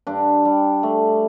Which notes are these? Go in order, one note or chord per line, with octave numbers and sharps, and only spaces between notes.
G2 D4
G3
A3